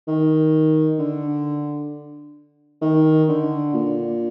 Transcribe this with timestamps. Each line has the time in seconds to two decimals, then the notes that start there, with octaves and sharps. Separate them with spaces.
0.08 D#3
0.99 D3
2.82 D#3
3.28 D3
3.74 A#2